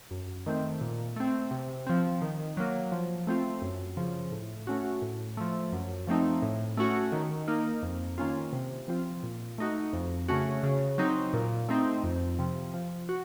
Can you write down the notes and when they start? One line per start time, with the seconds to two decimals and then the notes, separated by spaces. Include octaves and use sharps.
0.11 F#2
0.46 D#3 A3 C4
0.81 A#2
1.16 A3 C4
1.51 C3
1.87 F3 C4
2.22 D#3
2.57 F#3 A#3
2.92 F3
3.27 A3 C4 F4
3.62 F#2
3.97 C#3 F3
4.32 A2
4.67 A3 C#4 F#4
5.02 A2
5.37 F3 A3
5.73 F#2
6.07 F3 A3 C4 D#4
6.42 A2
6.77 A3 C#4 F#4
7.12 D#3
7.48 A#3 D#4
7.83 F2
8.18 D#3 A#3 C#4 F4
8.53 C3
8.88 F3 C4 F4
9.23 A#2
9.58 A3 D#4 F#4
9.93 F2
10.28 C#3 A3 C#4 F#4
10.63 C#3
10.98 F#3 C4 D#4
11.33 A#2
11.69 A3 C4 D#4
12.04 F2
12.39 C3 F3
12.74 F3
13.09 F#4